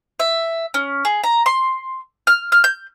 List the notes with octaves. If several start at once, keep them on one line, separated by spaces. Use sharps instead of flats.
E5
C#4
G#4
A#5
C6
F6
F6
G6